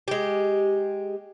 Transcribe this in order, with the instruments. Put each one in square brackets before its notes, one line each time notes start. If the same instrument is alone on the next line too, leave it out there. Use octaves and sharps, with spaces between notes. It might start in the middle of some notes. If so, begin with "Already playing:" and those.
[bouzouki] G#3 G4